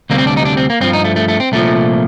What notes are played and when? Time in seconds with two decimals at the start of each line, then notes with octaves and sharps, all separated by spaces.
0.10 D2 C3 G3 A#3
0.18 C4
0.27 D4
0.37 D#4
0.45 D4
0.57 C4
0.70 A#3
0.80 G2 F3 C4
0.93 D#4
1.05 A3
1.16 A3
1.28 A3
1.40 C4
1.52 C2 A#2 F3 A3